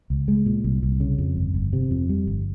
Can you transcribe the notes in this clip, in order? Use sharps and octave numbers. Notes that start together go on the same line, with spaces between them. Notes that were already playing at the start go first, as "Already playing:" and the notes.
C#2
G#3
A#2
C2
C2
C#3
F2
G1
G1
C3
F2
G3
G1